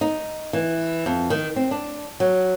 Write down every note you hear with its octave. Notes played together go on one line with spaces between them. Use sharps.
D#4
E3
F2
D#3
C4
D4
F#3